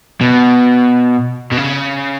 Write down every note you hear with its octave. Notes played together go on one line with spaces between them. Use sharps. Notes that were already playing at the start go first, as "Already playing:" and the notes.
B2
B2
C#3